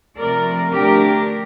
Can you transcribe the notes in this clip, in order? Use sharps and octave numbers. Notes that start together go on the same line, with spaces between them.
C3 F3 A3 A#4 D5
D3 A3 D4 G4 A#4